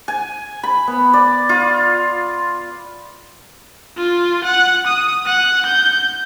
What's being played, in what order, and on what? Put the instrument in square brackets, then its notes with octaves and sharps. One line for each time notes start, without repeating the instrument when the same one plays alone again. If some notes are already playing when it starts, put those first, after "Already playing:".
[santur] G#5
B5
B3
D5
F4
[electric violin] F4
F#5
D#6
F#5
G6